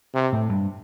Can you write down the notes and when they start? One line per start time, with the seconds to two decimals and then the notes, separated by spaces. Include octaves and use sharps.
0.14 C3
0.33 A2
0.50 G2